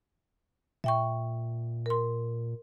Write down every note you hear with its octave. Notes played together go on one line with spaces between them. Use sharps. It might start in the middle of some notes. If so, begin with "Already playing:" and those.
A#2 E5 G5 C#6
A#4 C6